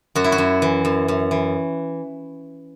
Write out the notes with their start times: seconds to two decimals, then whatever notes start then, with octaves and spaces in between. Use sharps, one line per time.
0.15 F#2 F#4
0.24 E4
0.32 F#4
0.38 F#2
0.62 E3
0.85 F#2
1.08 F#2
1.31 E3